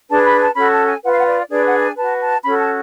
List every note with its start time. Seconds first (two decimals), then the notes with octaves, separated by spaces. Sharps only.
0.09 D4 G#4 B4 A5
0.25 B5
0.41 A5
0.56 C#4 F#4 A4 B5
0.72 A5
0.87 G#5
1.03 F4 B4 F#5
1.11 F5
1.18 F#5
1.27 D5
1.50 D4 G#4 B4 D5
1.66 F#5
1.81 G#5
1.97 F#4 B4 A5
2.21 A5
2.44 C#4 F#4 A4 B5
2.59 A5